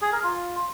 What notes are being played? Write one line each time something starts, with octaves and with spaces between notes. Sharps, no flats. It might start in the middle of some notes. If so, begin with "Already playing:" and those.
G#4
A#4
F4